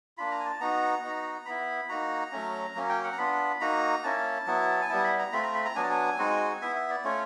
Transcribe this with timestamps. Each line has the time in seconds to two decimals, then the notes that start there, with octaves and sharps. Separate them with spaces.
0.18 A#3 D4 F4 B5
0.31 A#5
0.40 G#5
0.46 A5
0.60 B3 D#4 F#4 A#5
1.03 B3 D#4 F#4
1.46 B3 E4 B5
1.89 A#3 D#4 F#4 A#5
2.32 F#3 A3 C#4
2.75 F#3 A#3 C#4
2.90 G5
3.04 F#5
3.13 A#5
3.18 B3 D4 F4 B5
3.61 A#3 D#4 F#4 A#5
4.04 A#3 C#4 E4 A5
4.47 F#3 B3 E4
4.82 G#5
4.89 G3 B3 E4 A5
5.04 B5
5.19 A#5
5.32 A3 C4 F4 B5
5.43 A#5
5.54 B5
5.65 A#5
5.76 F#3 B3 D4 G#5
5.83 A5
5.90 G#5
6.18 G#3 C4 D#4 F#4
6.62 B3 E4 E5
6.76 E5
6.90 D5
7.04 A3 C#4 F4 C#5